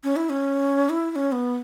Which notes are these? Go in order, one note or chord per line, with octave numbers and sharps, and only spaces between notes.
C#4
E4
C#4
E4
E4
C#4
B3